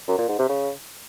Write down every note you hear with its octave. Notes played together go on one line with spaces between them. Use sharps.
F#2
A#2
G#2
C3
C#3